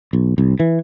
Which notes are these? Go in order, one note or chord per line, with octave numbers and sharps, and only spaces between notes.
B1
C2
E3